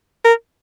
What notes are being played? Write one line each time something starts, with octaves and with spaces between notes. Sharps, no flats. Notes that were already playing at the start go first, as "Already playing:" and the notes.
A#4